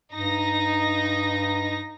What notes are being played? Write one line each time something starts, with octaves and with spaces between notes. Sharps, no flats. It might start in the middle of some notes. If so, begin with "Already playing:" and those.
G2 D#4 A#6